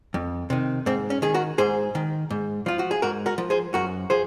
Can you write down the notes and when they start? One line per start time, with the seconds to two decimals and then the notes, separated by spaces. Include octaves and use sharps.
0.14 F2
0.50 C3 D#3
0.86 G#2 C4
1.10 C#4
1.22 D#3 G#4
1.34 F#4 A#4
1.58 G#2 G#4 C5
1.95 D#3
2.30 G#2
2.66 F3 F4
2.79 F#4
2.91 G#4
3.02 G#2 F#4 A#4
3.26 F#4 A#4
3.38 F3
3.50 G#4 C5
3.74 F#2 F#4 A#4
4.10 F3 G#4 C5